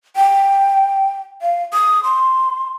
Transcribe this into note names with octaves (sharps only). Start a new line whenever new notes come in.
G5
F5
D#6
C6